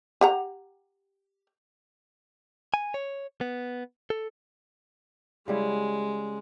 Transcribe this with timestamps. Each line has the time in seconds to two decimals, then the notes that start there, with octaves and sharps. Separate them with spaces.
0.21 G4 F#5 A#5
2.74 G#5
2.94 C#5
3.41 B3
4.10 A4
5.48 C#3 G3 G#3 E4